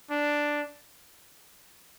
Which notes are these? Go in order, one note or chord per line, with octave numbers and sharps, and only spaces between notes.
D4